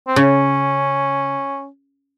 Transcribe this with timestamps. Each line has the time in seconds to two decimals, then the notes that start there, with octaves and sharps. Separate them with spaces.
0.08 C4
0.16 C#3 C#4